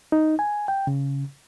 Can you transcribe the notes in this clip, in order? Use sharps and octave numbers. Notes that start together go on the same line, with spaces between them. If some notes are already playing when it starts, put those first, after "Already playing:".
D#4
G#5
G5
C#3